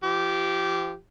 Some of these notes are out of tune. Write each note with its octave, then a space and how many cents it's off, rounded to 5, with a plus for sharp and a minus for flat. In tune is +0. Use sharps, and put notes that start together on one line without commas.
F3 -35 G4 -15